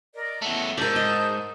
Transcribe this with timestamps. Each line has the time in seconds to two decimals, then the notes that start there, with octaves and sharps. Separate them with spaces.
0.15 A#4 D5 D#5
0.42 E2 A3 F#5
0.78 F2 G#2 A#4 D5 A5 E6 G6
0.96 D#5